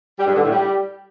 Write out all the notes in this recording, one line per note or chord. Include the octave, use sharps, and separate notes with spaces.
G3
G2
D3
A2
G3